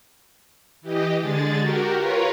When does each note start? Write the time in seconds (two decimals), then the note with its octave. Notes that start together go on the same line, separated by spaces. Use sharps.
0.81 E3 G4 D#5
1.21 D3 G#3 G#4 A6
1.58 F#4 G4 A#4
1.96 F4 A#4 B4 C#5